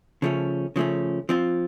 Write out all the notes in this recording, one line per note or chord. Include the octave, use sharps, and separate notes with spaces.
C#3 F3 A3 C#4
C#3 F3 A3 C#4
F3 C4 F4